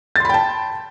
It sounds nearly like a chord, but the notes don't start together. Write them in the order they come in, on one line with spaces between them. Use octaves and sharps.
A6 C6 B5 G5 A5